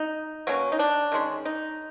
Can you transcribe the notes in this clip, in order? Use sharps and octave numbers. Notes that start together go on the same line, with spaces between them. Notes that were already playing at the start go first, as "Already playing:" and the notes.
Already playing: D#4
B2 F#3 A#3 C#4
D#4
D4
D#3 G#3 C#4
D#4